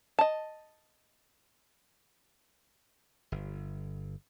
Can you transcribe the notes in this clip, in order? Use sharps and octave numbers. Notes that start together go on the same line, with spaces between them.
D#5 A5
G1